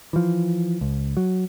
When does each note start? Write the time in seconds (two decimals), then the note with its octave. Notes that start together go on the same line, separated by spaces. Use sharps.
0.13 E3 F3
0.81 C#2
1.17 F#3